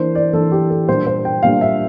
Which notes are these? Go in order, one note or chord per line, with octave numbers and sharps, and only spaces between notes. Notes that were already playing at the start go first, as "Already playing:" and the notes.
Already playing: E3 A#3 D4 C5
D5
E3 A#3 D4 A4
G4
A4
A#2 G3 A#3 D4 C5
C5
G5
A#2 G3 A#3 D4 F5
E5